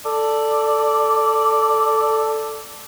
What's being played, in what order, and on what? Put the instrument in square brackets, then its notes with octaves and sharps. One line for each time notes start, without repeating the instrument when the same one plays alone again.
[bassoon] A4 [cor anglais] D5